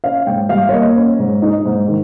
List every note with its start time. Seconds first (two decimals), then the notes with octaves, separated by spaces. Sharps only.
0.04 C#4 F5
0.27 G#2 G5
0.49 G3 F5
0.69 C#5
0.73 A#3 D#5
0.96 C#4
1.19 G#2
1.42 D#4
1.65 G#2
1.89 D#3